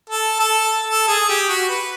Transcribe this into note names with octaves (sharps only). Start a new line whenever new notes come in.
A4
A4
A4
G#4
G4
F#4
B4